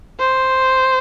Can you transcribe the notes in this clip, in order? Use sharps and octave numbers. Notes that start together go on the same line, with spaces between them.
C5